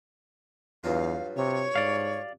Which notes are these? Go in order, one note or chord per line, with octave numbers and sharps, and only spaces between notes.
E2 G2 F#3 F4 F5
C3 C#5
G#2 D5 F5